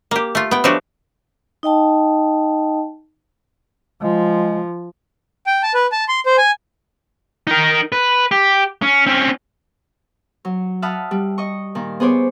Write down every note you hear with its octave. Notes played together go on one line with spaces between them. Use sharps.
A#3 G4
A3 F4
B3 G5
F3 F#3 A3 D4 F#4 G4
D#4 D#5 G5 A5
F3 G#3
G5
A5
B4
A5
C6
C5
G#5
D#4 A#4
B4
G4
C#4
C4 C#4
F#3
E5 F#5 A5 B5 D#6 F6
G3
D#5 C#6
A#2 D#3
B3 G#4 C5 C#5 D6